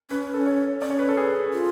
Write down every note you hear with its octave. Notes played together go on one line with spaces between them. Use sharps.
C#4 B4
A4
C#5
C#4 D5
C#5
B4
A4
G#4
F4